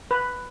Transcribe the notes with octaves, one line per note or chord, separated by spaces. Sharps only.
B4